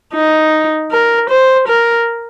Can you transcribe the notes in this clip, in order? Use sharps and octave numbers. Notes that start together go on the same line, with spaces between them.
D#4
A#4
C5
A#4